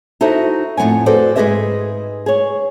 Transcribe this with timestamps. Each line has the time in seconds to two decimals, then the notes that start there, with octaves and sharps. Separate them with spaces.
0.21 D#4 E4 F#4 A4 C5 E5
0.77 F2 A2 C4 F#5 G#5
1.06 F#4 G#4 A4 B4 C5 D5
1.36 G#2 G#3 G#4 B4 D#5 E5
2.26 G#4 C#5